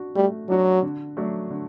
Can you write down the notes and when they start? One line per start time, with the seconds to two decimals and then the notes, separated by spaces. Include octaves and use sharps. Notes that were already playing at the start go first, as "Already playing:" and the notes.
Already playing: D4 F#4
0.15 G3 A3
0.49 F#3 D4 F#4
0.83 D3
1.17 F#3 A3 D4
1.50 D3